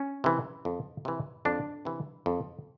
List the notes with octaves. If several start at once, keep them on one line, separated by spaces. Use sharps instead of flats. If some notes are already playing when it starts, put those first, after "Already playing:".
Already playing: C#4
C3 E3
F2
C3 E3
F2 D4
C3 E3
F2